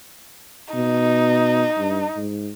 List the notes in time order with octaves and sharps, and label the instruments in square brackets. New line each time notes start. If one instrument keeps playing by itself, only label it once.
[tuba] B2 [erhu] D#4
[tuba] G2
G#2